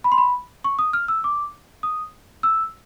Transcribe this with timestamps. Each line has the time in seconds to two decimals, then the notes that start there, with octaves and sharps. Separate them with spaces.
0.04 B5
0.12 C6
0.18 B5
0.64 C#6
0.79 D#6
0.93 F6
1.08 E6
1.24 D6
1.83 D#6
2.43 E6